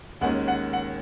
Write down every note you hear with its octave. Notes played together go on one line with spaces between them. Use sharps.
D#2 D#3 G#3 C#4 F#5
F#5
F#5